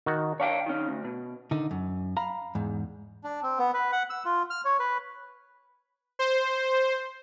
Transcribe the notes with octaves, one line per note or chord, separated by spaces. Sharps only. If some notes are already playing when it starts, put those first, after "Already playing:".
D#3 F#4
D4 C#5 F5 G5
D#3 C#4
D2
B2
D3 D#3 D#4
F#2
F5 A#5 B5
E2 G#2
D4
C4
B3
B4
F#5
E6
F4
F6
C#5
B4
C5